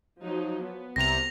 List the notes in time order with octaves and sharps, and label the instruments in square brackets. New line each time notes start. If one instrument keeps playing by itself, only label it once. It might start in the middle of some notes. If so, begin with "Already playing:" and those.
[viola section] F3 F#3 D#4
B3
[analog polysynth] C2 C3 A#5 [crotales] A#6 F7